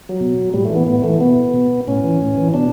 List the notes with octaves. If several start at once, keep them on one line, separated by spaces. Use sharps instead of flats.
F#3
B2
A2 G3
A3
E3
B3
A2 B3
E3 A3
B2 B3
B2
A2 C#4
E3
A2
E3
B2 D4